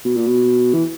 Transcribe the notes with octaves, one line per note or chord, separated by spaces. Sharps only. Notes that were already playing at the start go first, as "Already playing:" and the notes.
B2
A#2
B2
E3